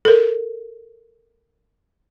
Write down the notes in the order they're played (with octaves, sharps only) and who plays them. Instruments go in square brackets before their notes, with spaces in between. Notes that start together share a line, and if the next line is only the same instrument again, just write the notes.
[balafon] A4 A#4